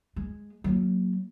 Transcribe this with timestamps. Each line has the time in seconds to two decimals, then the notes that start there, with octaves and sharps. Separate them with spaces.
0.16 G#3
0.64 F#3 A#3